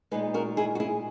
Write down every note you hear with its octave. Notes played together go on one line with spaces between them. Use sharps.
A#2 G#3 D#4 G#4 B4
F#4 A#4
E4 G#4
F#4
E4 G#4